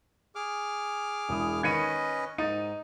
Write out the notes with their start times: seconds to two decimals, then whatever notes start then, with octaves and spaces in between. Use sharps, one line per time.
0.35 G#4 D6 F6
1.29 E1 E4 D#6
1.63 D#3 C#4 B4 D#5 B5 G#6 C#7 D#7
2.38 G#2 D#4 A6 D#7